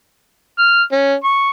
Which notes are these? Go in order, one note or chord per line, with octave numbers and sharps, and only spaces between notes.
F6
C#4
C#6